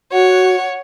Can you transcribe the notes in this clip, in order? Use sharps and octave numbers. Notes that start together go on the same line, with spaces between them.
F#4 C#5 F#5